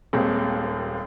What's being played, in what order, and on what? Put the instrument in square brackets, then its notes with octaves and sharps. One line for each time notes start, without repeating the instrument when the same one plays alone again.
[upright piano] D#1 D#2 G#3 C4